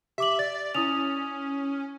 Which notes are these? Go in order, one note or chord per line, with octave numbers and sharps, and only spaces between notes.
G4 E5 D6 F#7
D5 A6
C#4 E4 D#6 F7